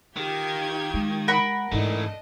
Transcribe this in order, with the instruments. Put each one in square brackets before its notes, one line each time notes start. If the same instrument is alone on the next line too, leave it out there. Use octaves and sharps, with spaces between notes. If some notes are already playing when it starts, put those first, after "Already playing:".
[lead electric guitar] D#3 [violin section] F4 G4 G#6
[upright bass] G#3
[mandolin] A#4 F#5 B5
[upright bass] G#2 E4 [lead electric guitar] E3 A3 [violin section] D4 D#5